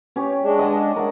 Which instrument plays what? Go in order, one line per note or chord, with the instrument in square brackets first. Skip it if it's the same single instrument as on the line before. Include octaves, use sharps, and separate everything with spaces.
[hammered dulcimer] C#4 G4 C#5
[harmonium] G#3 D4
[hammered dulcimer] D#5 F#5 A5
A#4 F#5